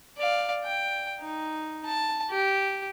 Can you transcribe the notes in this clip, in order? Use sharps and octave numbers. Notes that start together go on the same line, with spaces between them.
D5 F5
G5
D#4
A5
G4